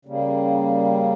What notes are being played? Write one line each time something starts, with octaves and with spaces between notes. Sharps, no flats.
C#3 G3 A#3